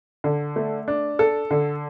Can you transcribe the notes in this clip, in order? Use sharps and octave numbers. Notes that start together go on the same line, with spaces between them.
D3
A3
D4
A4
D3